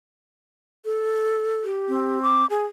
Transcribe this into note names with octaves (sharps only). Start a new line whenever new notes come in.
A4
G4
C4
D6
G#4